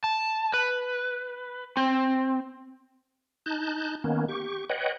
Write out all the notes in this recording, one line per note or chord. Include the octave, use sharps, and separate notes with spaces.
A5
B4
C4
D#4 A5 F#6 G6
D#3 A#3 B3 C#4
G4 C#6
B4 C#5 D#5 F#5 G5